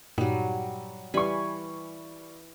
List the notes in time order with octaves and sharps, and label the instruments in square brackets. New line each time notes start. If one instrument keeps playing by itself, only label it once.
[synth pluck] G2 A#2 D#4 [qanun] F#3 G3
[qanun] E3 G#5 B5 [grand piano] G3 C#6